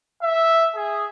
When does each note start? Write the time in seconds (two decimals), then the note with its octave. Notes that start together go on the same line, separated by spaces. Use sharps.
0.22 E5
0.75 G#4